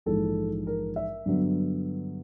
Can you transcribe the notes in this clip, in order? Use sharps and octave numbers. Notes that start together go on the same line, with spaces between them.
A#1 G#2 E3 G#3 A4
A#4
E5
G2 D3 F#3 B3